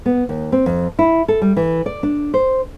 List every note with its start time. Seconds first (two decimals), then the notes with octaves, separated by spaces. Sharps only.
0.06 B3
0.29 D#2
0.52 C4
0.66 F2
0.99 E4
1.28 A4
1.42 G3
1.56 E3
1.86 D5
2.03 D4
2.34 C5